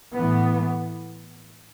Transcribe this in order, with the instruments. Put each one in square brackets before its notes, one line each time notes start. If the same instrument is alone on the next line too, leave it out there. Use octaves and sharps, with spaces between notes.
[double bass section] A2 E3 B3